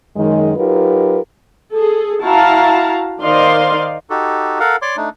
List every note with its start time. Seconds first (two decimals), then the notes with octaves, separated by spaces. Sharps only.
0.16 F#2 D#3 G#3
0.57 F#3 D#4 F4 G4 A#4 B4
1.72 G#4 A4
2.22 E4 F#4 F5 A5 A#5
3.22 D#3 C5 D5 D#5 F5 C6
4.10 D#4 F#4 G4 A4
4.60 A4 A#4 F5 F#5
4.82 C#5 D5 C6 D6
4.97 A3 D4 D#4